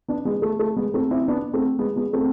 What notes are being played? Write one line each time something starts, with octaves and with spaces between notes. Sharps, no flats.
B3 D4
G#3 B3
A3
A3
G#3 B3
A3 C4
C4 E4
B3 D4
A3 C4
G#3 B3
G#3 B3
A3 C4